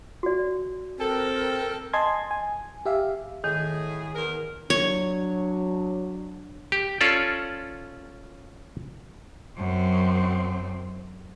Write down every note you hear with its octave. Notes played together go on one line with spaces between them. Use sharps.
F#4 D5
C4 A4 A#4 G5
D#5 G#5 A5 C6 G#6
G#5
G4 E5 F5
A2 D#3 G#4
E2 A#4
F#3 D4 C#5
G4
C#4 F4 A4 D5
F#2 C4